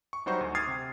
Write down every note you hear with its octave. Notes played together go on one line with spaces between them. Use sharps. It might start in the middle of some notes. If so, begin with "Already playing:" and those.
C#6
F#3 G3 D#4 F#4 C5 C#6
D2
D6 D#6 F6 G#6 A6 C7
C3